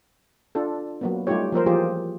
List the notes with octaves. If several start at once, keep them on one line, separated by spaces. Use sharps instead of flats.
D4 F4 A4
F#3 A#3 B3
G3 A3 D#4 F4 G4 C#5
F3 A#3 A#4 C5
E3 F3 F4 G4 G#4 C5